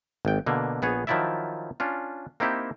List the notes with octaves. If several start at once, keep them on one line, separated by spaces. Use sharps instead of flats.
G#1 G5
B2 D3 A#3
A#1 B3 G#4 C#5
D#3 F3 F#3 E4 D5 E5
C#4 D4 F4
A#3 C4 D#4 E4 G4